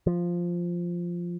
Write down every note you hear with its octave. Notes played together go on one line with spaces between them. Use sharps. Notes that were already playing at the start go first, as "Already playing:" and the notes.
F3